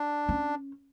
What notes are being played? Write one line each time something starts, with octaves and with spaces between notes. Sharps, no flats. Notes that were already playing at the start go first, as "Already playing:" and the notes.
Already playing: D4
C#4